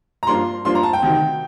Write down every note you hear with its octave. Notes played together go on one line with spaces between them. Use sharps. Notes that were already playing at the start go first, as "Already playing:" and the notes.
A#5
G2 F3 A#3 D4 F4 C6
G2 F3 A#3 D4 F4 C6
A#5
A5
G5
D2 C3 D#3